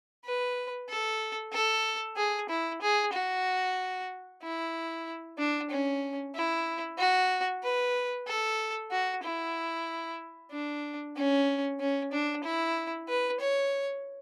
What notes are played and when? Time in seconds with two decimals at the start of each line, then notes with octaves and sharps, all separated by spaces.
0.24 B4
0.89 A4
1.53 A4
2.16 G#4
2.49 E4
2.82 G#4
3.13 F#4
4.42 E4
5.38 D4
5.70 C#4
6.35 E4
6.98 F#4
7.63 B4
8.27 A4
8.91 F#4
9.23 E4
10.51 D4
11.16 C#4
11.80 C#4
12.12 D4
12.44 E4
13.08 B4
13.40 C#5